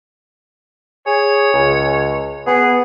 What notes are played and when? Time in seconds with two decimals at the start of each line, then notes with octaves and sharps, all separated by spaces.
1.07 G#4 C#5
1.54 C#2
2.47 B3 G#4